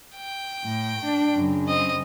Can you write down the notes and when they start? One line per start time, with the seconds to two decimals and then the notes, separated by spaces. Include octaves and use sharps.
0.16 G5
0.64 A2
1.05 D4
1.35 F#2 C#3
1.68 C4 D#5